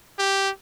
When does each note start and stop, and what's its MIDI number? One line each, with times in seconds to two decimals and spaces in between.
0.19 0.50 67